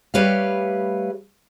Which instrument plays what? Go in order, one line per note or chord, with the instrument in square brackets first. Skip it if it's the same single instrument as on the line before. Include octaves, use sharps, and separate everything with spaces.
[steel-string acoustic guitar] G3 A3 G4 B4 C#5 F5